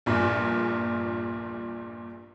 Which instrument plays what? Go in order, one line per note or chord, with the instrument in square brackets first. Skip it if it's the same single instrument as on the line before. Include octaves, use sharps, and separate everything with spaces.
[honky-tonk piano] A#1 E2 G2 A#2